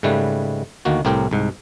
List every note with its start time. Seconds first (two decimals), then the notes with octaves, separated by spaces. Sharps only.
0.03 G#2 C#3 G3 A3 B4
0.85 D2 D#3 A#3 F#4
1.05 C2 A2 C4 G4 A#4 G5
1.31 C2 G#2